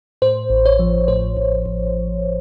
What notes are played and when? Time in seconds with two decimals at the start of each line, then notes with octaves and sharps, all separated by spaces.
0.22 A2 C5
0.50 A1
0.66 C#5
0.79 F3
1.08 A2 C5
1.37 A1
1.66 A1